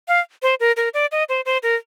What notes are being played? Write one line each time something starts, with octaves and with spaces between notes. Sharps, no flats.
F5
C5
A#4
A#4
D5
D#5
C5
C5
A#4